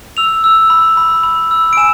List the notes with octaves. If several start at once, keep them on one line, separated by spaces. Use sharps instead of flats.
E6 F7
E6
B5
B5
B5
E6
D7
G#5 E7